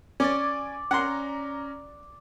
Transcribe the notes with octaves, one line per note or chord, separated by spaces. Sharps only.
C#4 D5 G#5 D6 A6
C#4 F#5 A#5 C6